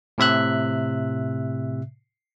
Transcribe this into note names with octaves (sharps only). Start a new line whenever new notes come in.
A2 C3 E5 F#6